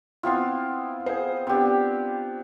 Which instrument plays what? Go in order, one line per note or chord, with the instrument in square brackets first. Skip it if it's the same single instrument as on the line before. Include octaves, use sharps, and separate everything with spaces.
[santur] B3 C4 F4 [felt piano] E4 C6
[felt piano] G#4 C5
[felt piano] B3 D4 [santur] C4 G4